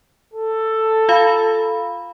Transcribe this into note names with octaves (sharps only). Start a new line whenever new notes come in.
A4
F4 F5 B5